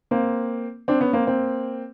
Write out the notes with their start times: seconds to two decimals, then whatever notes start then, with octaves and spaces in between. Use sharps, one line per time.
0.11 A#3 C4
0.88 C4 D4
1.01 B3 C#4
1.13 A#3 C4
1.27 A#3 C4